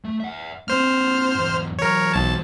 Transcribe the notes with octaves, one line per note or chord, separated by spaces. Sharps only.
A3
E5 F#5
A#3 C4 C5 F6
E2 G#2
E3 F#3 A#4 C#5
B1 A5